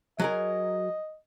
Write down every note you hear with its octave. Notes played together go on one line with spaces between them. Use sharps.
F#3 G#4 A#4 D#5